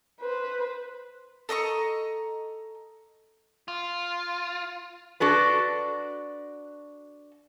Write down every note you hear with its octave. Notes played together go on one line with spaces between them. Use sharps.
B4 C5
A4 D#5 A#5 C#6
F4
D4 F#4 A4 B4